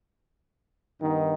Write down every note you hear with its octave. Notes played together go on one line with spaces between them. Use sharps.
G2 D#3 B3 D#4